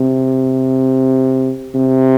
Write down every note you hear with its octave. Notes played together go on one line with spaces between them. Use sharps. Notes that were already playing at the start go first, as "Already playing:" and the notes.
Already playing: C3
C3